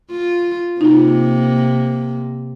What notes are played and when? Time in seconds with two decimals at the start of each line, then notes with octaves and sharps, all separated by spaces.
0.11 F4
0.81 C3 A#3 D#4 F4